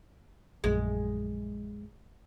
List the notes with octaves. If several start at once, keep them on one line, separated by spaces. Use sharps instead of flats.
A#1 F#2 G#3